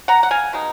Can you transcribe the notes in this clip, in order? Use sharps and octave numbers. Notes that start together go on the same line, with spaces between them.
F#5 A#5
F#5
F5 G#5
B2 G#3 D#4